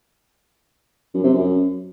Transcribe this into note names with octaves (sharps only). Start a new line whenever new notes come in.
F#2
C3
F#2